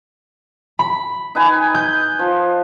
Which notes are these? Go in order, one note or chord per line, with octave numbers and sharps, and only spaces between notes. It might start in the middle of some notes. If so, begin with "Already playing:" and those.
B5
D#4 B4 G#5
G6
F3